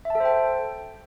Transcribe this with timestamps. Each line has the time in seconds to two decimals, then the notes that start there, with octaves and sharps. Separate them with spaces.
0.05 E5
0.10 A5
0.15 A4
0.20 C5
0.25 G5